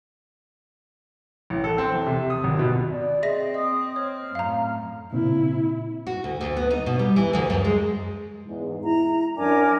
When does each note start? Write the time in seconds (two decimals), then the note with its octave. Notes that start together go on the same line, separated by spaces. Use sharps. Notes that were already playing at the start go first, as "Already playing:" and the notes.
1.50 A1
1.64 A4
1.78 C4
1.92 E2
2.06 C3
2.30 D#6
2.44 G#1
2.59 B2
2.90 D5
3.22 C4 G#4 D#5 E5 A#6
3.54 D#5 D#6
3.96 C#5 F6
4.35 F#2 A2 F5 A#5
5.13 A#2 C#3 C4 E4
6.07 F#4
6.24 D2
6.41 D2
6.57 B3
6.70 D#4
6.86 B2
6.99 G3
7.16 E3
7.33 D2
7.50 F#2
7.65 G#3
8.46 E2 G#2
8.83 E4 A#5
9.37 F#2 D4 A#4 G#5 D6